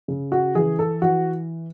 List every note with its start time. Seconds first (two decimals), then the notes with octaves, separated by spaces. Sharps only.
0.08 C#3
0.32 F#4
0.55 E3 G#4
0.79 A4
1.02 E3 F#4